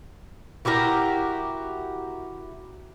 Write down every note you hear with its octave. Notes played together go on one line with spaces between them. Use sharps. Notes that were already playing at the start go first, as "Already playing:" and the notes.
E4 F#4 G4 A#4